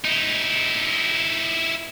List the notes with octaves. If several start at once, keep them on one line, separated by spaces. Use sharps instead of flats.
D#4 E4